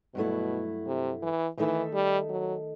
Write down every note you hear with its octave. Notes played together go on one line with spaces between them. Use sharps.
G2 B2 F#3 A3 E4
C3
E3
D#3 E3 A3 D#4 A4 E5
G3
F#3